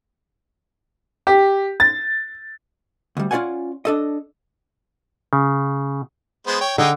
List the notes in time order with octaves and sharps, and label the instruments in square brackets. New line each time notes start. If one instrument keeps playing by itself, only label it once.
[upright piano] G4
A6
[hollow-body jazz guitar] D2 G3
C#4 F4 G#4 D5 F#5 G#5
D4 A4 D#5
[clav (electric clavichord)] C#3
[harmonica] G#3 B3 C5
C#5 G5
[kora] D3 [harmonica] D#4 G#4 G5